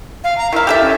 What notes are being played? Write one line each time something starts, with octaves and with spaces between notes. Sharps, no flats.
F5
A#5
D#3 E4 F5
G4 A4 E5
C#4